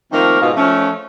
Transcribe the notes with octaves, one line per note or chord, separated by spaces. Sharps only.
D#3 F3 A3 A#3 C4 A#4
G#2 B2 F4
F3 A3 C#4